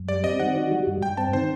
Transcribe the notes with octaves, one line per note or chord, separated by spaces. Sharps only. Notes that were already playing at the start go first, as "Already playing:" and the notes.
Already playing: F#2
G3 D5
C4 D#5
D#3 F#5
F#4
G3
G2
G2 G5
C4 A5
D#3 C5